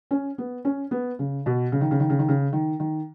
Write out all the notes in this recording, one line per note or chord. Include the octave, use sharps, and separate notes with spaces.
C#4
B3
C#4
B3
C#3
B2
C#3
D#3
C#3
D#3
C#3
D#3
C#3
D#3
D#3